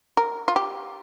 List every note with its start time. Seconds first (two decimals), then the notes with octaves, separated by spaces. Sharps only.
0.17 A#4
0.48 F4
0.56 G4